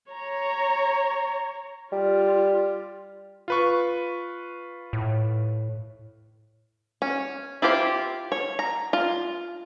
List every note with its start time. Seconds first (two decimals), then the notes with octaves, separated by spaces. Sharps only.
0.11 C#5 A#5
1.92 G3 F4
3.48 F4 B4 C#6
4.93 A2
7.02 C#4
7.62 E4 F4 G4 C5
8.32 C#5
8.59 A#5
8.93 F4